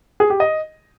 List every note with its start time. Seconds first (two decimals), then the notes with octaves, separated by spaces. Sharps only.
0.20 G#4
0.30 G4
0.40 D#5